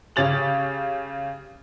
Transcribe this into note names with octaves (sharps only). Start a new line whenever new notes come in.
C#3 G4 C#5 A6 F7 F#7